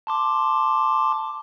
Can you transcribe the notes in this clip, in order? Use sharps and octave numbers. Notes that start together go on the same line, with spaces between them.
A5 C6 D6